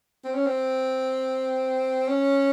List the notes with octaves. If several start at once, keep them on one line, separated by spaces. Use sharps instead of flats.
C4
C#4
C4
C#4